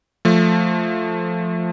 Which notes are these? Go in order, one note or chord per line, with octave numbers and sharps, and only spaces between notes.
F3 A3